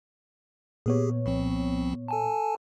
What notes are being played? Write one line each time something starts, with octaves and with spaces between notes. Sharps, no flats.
A#2 B3 G4 G#4 C#5
C2 F3 C4
A4 G#5 A5